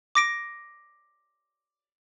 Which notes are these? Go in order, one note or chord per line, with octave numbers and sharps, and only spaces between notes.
D6 A#6 D7